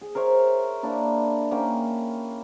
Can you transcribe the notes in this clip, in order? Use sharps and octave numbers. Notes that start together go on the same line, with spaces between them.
G#4
A#4 C5 C#5 E5
A#3 D4 E4
A#3 C#4 G5